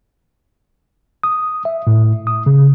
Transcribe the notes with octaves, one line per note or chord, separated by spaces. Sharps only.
D#6
E5
A2
D#6
C#3